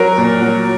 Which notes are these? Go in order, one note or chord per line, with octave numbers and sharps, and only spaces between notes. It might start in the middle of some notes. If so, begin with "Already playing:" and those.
Already playing: F#3 A#4
A#2
F#3